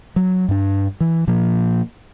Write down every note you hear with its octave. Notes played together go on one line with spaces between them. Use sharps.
F#3
G2 D4
E3
A#2 F3 A#3